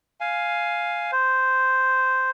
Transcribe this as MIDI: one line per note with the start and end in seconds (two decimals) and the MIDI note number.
0.20 1.11 77
0.20 1.11 80
1.12 2.30 72